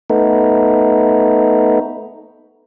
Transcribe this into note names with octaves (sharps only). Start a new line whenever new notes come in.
A3 B3 D#4